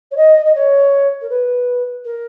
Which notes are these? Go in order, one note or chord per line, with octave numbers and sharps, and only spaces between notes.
C#5
D#5
D#5
C#5
A#4
B4
A#4